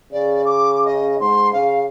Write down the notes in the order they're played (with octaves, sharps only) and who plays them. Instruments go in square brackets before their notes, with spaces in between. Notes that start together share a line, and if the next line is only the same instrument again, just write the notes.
[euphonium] C#3 [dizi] D5
[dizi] D6
D#5
[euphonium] G#2 [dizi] C6
[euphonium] C#3 [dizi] F5